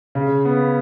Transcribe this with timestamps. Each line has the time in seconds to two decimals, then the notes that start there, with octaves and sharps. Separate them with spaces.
0.15 C#3
0.45 B3